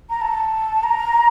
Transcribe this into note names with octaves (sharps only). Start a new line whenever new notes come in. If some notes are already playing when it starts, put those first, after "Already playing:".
A#5
A5
A#5